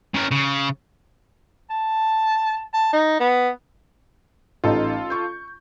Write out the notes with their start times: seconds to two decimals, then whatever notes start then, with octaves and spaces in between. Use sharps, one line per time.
0.15 C#3 A#4
0.31 C#3
1.70 A5
2.74 A5
2.93 D#4
3.20 B3
4.64 A1 D#4 F4 A4
5.10 C#6 G6